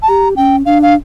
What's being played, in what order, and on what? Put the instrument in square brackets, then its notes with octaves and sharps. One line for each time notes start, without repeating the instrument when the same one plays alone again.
[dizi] A5
[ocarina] G4 [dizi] A#5
[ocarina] C#4 [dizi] G5
[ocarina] D4 [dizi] F5
[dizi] F5